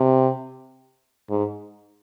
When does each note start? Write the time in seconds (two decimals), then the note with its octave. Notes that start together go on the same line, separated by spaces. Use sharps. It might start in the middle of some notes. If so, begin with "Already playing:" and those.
Already playing: C3
1.30 G#2